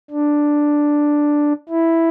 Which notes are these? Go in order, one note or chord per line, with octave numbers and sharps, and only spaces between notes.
D4
E4